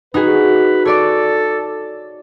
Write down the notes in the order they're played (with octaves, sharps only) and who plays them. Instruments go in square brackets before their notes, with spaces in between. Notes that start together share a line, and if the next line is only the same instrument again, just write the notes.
[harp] D#4 F#4 G#4 [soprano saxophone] B4
[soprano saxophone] A4 [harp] C#5 D5 D6